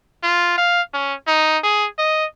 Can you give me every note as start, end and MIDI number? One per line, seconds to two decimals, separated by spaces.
0.23 0.55 65
0.57 0.82 77
0.94 1.14 61
1.27 1.58 63
1.63 1.87 68
1.98 2.25 75